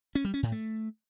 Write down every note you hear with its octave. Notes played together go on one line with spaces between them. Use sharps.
C#4
G3
C#4
A2
A3